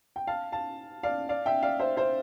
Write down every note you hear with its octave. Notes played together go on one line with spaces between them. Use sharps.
G5
F5 A5
F5 A5
D5 F5
D5 F5
E5 G5
D5 F5
C5 E5
C5 E5